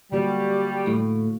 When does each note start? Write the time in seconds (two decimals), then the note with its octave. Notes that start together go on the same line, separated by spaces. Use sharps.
0.12 D3 G3 A#3 F#4
0.87 A2